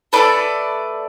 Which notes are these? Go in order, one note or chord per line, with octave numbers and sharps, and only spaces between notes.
A3 D4 A4 B4 D5